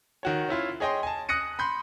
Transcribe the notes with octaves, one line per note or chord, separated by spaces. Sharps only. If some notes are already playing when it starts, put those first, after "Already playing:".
D#3 F#4 C#5
C#4 E4 F4
G#4 C#5 D#5 G5 C6
G#5 A5
D#6 F#6 A#6 C#7 D#7
B5 C6 G6